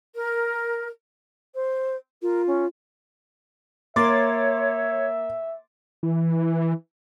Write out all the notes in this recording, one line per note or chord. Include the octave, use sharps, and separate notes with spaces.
A#4
C5
F4 A#4
C#4
A#3 C#5 E5 C6 D6 A6
E3